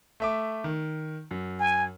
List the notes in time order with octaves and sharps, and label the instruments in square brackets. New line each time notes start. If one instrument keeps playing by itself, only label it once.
[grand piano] A3 E5 D6
D#3
F#2
[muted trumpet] G#5